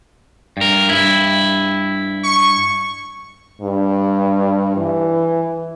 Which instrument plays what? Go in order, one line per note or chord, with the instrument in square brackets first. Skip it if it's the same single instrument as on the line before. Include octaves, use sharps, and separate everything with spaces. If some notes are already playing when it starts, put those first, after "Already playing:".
[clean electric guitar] G2 A#4
G2 E4
[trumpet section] C#6
[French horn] G2
E3